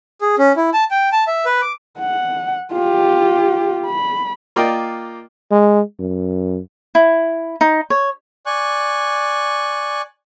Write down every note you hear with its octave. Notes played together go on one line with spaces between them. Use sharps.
G#4
C#4
E4
A5
G5
A5
E5
B4
D6
F#5
F4 G4
B5
A#3 F4 D5 D#5 G5
G#3
F#2
E4
D#4
C#5
D5 G#5 C#6 F#6